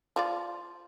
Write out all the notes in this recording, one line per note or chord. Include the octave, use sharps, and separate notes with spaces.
F3 F4 D5